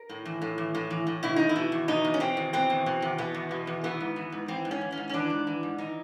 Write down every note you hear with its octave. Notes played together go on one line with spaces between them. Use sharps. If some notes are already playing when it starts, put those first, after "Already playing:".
Already playing: A#4
A2
E3
A2
E3
A2
E3
A2
B2 E4
E2 D#4
E4
B2
E2
B2 D#4
E2
C#4
B2 C4
E2
B2 C4
E2
B2
E2
B2 B3
E2
B2
E2
E3 B3
G#2
E3
G#2
E3 C4
G#2
C#4
E3
C#4
G#2
C#4
E3 D4
G#2
E3
G#2
E3 D#4